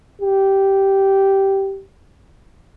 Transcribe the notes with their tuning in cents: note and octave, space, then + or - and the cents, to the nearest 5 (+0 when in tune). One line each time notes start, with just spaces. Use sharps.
G4 -10